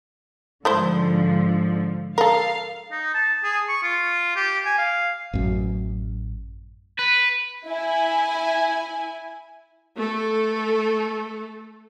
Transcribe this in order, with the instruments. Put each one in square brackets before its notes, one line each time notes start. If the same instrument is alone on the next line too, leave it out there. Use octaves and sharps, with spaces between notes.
[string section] G#2 D3 F3 [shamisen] A3 E4 C5
[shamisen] A4 A#4 [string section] F5
[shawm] D#4
A5
G#4
C#6
F4
G4
G#5
F5
[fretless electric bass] A1 F#2
[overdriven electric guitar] B4
[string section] E4 G#5
[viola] A3 A4